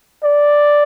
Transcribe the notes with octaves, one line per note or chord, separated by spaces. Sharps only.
D5